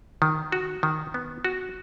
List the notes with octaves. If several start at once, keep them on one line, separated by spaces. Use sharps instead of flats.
D#3
F#4
D#3
B3
F#4